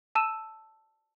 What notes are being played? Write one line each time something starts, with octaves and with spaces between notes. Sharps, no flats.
A5 E6 D#7 E7